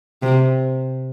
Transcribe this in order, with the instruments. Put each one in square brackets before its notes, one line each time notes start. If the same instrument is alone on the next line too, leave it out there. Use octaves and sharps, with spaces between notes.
[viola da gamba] C3